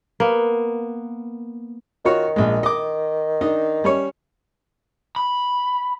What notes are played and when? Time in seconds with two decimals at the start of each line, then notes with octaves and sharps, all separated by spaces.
0.20 A#3 B3
2.05 D#3 F4 F#4 C#5
2.36 A#1 G#3
2.63 D#5 D6
3.41 D4 D#4 D#5
3.84 G3 C#4 C#5
5.16 B5